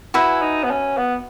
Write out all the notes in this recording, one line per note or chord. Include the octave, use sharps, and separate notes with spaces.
E4 F#4 B4 E5 G#5
D#4
B3
C#4
B3